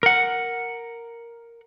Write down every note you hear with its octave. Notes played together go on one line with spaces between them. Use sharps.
A#4 F#5